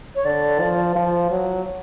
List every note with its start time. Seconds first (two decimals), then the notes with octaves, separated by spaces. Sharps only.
0.15 C#5
0.25 D3 D5
0.60 F3
0.95 F3
1.31 F#3